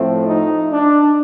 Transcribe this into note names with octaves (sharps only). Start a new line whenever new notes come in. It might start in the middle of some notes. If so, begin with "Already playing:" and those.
Already playing: A2 F3 A3 C4
D#4
D4